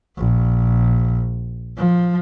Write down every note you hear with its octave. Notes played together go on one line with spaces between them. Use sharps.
A#1
F3